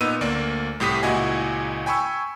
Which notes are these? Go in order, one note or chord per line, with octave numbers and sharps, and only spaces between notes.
A#2 B3 D#4 E6 D#7
D2 A#3 D5
C2 A2 G4 D#6 B6
C#2 A#2 E4 F#4 D#5 G#5
G5 G#5 B5 C#6 E6